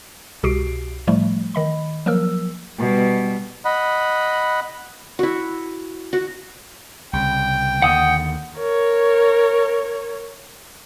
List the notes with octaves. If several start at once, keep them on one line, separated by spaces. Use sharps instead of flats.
C2 B2 F#4 G4 C7 D7
A2 F3 G3 A3
D#3 D#5 B5
F3 F#3 A#3 A#4 E6
B2 G3
D#5 F#5 B5
E4 F#4
F#4
C2 C#3 G5
D#2 D3 F#5 D#6
A#4 C#5